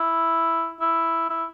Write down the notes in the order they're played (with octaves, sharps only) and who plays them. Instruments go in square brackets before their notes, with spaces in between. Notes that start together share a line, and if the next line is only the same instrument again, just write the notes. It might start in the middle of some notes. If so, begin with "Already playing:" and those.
Already playing: [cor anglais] E4
E4
E4